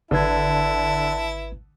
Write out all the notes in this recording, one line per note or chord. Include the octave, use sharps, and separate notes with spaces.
G#1 D3 E4 B4 A5 G#6